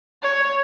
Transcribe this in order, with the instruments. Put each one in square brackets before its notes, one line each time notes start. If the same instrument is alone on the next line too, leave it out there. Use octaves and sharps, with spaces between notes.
[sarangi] C#5